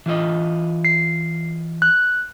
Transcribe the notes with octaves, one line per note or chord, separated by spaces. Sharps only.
E3 F4 D#5
C7
F#6